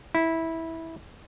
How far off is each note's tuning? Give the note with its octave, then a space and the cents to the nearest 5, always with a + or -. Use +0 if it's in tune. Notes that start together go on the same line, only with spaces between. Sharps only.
E4 -15